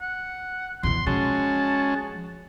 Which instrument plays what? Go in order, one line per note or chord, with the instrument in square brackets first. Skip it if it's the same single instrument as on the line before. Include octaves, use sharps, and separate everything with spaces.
[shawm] F#5
[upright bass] E2 B2 [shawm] C6
[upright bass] F3 [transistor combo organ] G#3 C#4 F#4 [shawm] A5